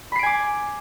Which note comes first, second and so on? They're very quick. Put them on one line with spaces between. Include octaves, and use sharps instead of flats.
B5 C7 D7 G#5 D6